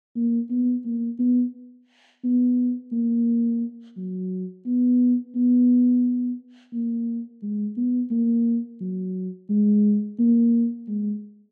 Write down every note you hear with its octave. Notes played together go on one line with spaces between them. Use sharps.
A#3
B3
A#3
B3
B3
A#3
F#3
B3
B3
A#3
G#3
B3
A#3
F#3
G#3
A#3
G#3